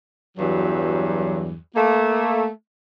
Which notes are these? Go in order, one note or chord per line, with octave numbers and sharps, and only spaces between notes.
E2 G2 F#3
A3 A#3